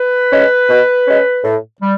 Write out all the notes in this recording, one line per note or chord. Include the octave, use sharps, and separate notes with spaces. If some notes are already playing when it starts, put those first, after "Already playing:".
Already playing: B4
G#3 C#4
B2
G#3 C#4
A2
G3